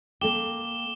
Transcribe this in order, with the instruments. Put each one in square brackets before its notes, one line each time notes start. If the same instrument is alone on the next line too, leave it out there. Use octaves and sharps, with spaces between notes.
[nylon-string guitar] A#3 A4 G5 [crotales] D6 E7 G7